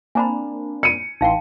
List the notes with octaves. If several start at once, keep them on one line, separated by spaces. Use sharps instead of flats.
A#3 C4 D4 G#5 A#5 B5
C#7 D#7
A1 E3 D#4 F5 G5 C6